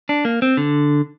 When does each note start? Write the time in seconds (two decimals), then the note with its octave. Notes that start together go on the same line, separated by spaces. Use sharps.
0.09 D4
0.25 A#3
0.42 C4
0.57 D3